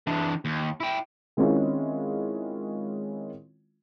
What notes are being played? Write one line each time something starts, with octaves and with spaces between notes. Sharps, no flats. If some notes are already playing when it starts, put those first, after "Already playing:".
E3 D4
D#2
E4 G5
D#3 G#3 C4 C#4 E4 F4